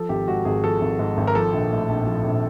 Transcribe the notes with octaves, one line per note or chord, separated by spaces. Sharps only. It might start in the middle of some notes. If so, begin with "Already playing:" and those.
Already playing: F3 A4
G#1 G4
G#2 F#4
G#1 G#4
F3 A4
G#1
G#2
G#1
A#4
F3 A4
A#1
A2
A#1
F3
A#1